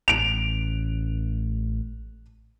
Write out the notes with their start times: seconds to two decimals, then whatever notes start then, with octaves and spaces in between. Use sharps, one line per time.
0.08 A1 D7 F7